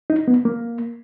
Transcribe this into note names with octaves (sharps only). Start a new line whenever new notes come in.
D#4
B3
A#3